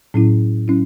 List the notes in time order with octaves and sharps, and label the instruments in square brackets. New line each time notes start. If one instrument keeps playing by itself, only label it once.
[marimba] A2 F#3 C#4 E4
F#3 C#4 E4